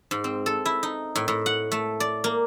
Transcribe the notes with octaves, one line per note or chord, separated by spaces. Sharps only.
G#2
C4
A4
E4
D#4
A2
A2
F#5
A3
D5
A#3